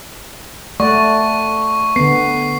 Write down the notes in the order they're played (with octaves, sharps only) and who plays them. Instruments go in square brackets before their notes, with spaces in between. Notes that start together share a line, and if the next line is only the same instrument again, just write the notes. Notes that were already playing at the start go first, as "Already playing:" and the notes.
[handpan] A3 D5 F#5 [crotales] C#6
[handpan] D3 B3 [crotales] C7